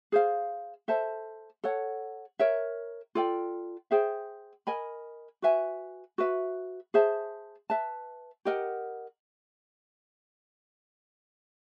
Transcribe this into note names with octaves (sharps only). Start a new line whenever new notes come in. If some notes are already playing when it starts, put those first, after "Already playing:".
G#4 C5 F5
A4 C5 E5 A5
A4 C#5 F#5
A#4 C#5 E5
F4 A4 D5 G5
G#4 C5 E5 G5
A#4 D#5 G#5 B5
F#4 B4 E5 G#5
F#4 B4 E5
G#4 C5 E5 A5
B4 E5 A5
G4 A#4 D#5 F#5